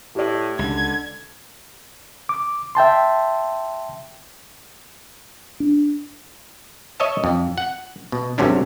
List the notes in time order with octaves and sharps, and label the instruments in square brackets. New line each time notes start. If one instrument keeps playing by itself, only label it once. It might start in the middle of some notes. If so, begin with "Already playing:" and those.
[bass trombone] A2 [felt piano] G4 D5
[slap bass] C#2 [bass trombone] D3 [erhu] G#6
[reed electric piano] D6
E5 G5 A5 C6
[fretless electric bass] D4
[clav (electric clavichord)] C#5 D#5 E5 A5
F2
F#5
B2
G#1 F#2 C3 C#4 D4